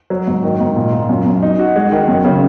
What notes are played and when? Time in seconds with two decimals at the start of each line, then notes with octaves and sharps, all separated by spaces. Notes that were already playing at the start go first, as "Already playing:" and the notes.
0.10 F#3
0.27 G#2
0.44 D#3
0.60 G#2
0.76 A#2
0.93 A#2
1.09 F#2
1.26 F#2
1.42 D#4
1.59 F#4
1.76 G#3
1.92 D#3
2.08 F#2
2.25 C#3